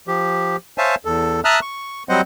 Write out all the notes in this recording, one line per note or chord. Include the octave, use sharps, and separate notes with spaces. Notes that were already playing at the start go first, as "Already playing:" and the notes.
F3 G4
C5 C#5 E5 F5 G#5 A5
E2 A4
E5 A5 A#5 D#6 F6 F#6
C#6
F#3 G3 C4 C5 D#5 F#5